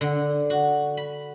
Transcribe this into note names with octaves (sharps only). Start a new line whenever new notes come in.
D3
F#4
B5